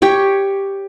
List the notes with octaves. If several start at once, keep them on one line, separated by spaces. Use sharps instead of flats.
G4 C#5